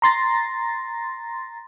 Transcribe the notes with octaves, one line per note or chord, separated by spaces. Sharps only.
A#5 C6 A6 A#6